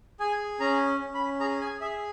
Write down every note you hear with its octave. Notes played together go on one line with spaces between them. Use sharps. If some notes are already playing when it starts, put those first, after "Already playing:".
G#4 G#5
C#4 A#5
C#4
B5
G#4 A#5
G#5
G#4 E5